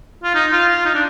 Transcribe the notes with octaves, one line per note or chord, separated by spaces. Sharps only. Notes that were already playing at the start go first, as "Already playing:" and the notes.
F4
D#4
F4
F4
D#4
D4